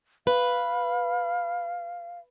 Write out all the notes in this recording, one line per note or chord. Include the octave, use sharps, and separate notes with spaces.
B4 F5